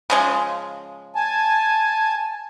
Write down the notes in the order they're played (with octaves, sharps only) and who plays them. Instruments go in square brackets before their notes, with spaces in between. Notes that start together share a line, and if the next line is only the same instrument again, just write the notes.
[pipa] C#3 F3 G#3
[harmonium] G#5 A5